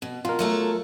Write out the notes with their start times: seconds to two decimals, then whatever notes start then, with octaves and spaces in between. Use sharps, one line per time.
0.02 B2
0.25 B2 F4 A#4
0.39 F#3 A3 A4